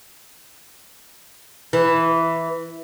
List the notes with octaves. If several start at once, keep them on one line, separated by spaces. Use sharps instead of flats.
E3